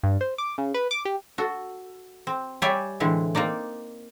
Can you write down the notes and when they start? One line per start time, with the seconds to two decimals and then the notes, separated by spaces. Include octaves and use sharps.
0.03 G2
0.21 C5
0.38 D6
0.58 C#3
0.74 B4
0.91 D6
1.05 G4
1.38 F#4 A4
2.27 C4
2.62 G3 G4 C#5 D5 E5 G#5
3.00 A2 D3 E3 G#3 C4
3.35 A#3 C4 D#4 D5